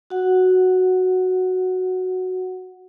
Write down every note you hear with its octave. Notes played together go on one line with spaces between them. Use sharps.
F#4 F#5